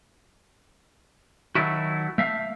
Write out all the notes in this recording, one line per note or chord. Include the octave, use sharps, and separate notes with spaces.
D#3 F#3 A3 E4 F#4
A3 E5 F5